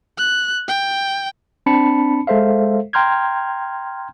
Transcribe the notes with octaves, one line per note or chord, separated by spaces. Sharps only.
F#6
G5
C4 D4 A5 B5 C#7
G#3 A4 C5 E5 F5
G5 A#5 C6 F6 G6 G#6